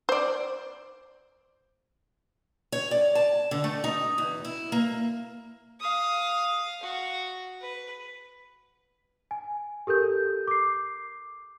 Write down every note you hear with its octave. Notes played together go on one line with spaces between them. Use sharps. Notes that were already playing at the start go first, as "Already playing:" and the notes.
C5 D5
C#5
D5
A5
D3
A3
D#4
E2
E4
A#3
F5 D#6
F#4
B4
G#5
G4 A4 A#4 G6
D6 C7